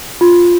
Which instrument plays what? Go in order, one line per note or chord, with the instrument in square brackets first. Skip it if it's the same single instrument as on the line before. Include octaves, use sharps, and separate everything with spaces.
[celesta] F4